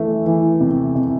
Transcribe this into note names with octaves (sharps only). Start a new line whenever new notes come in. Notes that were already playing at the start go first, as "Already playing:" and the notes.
Already playing: E3 A3
E3
C3
C3